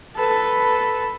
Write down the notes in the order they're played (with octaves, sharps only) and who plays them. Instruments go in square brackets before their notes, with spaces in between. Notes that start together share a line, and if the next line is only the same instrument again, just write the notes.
[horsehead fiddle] A4 B4